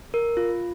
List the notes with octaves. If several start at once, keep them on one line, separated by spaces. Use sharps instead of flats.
A#4
F4